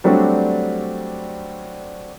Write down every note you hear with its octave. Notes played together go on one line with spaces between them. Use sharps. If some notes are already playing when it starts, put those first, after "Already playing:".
F#3 G3 A3 C4 D4 F#4